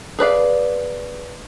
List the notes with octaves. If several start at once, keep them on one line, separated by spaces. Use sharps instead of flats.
G#4 B4 D5 F5